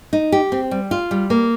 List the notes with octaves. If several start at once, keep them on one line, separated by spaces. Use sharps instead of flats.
D#4
G4
C4
G3
F4
G3
A#3